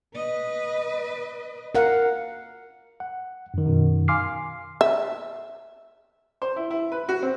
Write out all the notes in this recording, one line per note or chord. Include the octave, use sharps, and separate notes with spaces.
B4 D#5
A#4 F5 F#5
F#5
F#2 D#3
F#2 B2 D#3
F5 G#5 C6 D6 F6 C7
E5
C5
E4
E4
B4
F#4
C4